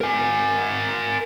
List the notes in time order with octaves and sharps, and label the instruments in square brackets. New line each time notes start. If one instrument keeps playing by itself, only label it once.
[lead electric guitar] A#4 G#5